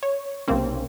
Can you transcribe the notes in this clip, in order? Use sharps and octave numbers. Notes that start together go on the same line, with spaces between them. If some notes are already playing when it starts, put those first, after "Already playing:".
C#5
B1 C3 A#3 C4 C#4